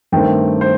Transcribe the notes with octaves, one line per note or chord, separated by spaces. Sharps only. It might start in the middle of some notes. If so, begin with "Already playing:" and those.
G2 D#3 A3 C4 G5
C5